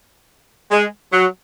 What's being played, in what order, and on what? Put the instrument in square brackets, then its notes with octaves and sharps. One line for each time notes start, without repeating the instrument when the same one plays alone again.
[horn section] G#3
F#3